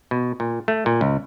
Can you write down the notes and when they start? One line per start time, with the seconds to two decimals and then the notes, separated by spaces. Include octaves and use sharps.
0.11 B2
0.40 A#2
0.68 A3
0.86 A#2
1.01 C#2